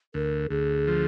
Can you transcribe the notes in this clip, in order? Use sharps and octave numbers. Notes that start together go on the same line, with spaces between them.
D2 A#4
D2 G#4
F3